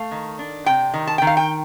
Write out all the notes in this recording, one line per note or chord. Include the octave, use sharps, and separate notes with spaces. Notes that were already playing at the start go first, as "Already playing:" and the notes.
Already playing: A3 F5
D#3
D4
C3 G5
D#3
A5
G5
D#3
F5
G5